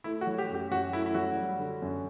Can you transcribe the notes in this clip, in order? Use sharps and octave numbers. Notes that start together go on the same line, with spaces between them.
A3 E4
F#4
F#3
G4
F#2 G4
F#2 F#4
A3 E4
E4
F#3 F#4
G3
D3
F#2